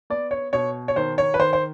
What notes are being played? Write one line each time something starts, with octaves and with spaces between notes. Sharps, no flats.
B3 D5
C#5
B2 C#5
C#5
D#3 C5
C#5
B4
D#3 C5
C5